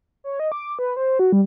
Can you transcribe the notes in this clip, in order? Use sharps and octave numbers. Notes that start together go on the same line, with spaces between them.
C#5
D#5
D6
B4
C5
F#4
G3